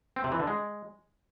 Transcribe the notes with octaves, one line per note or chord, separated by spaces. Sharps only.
C4
C3
E3
D3
G#3